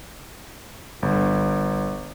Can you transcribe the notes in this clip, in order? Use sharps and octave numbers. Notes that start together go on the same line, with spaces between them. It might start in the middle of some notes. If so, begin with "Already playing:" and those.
G1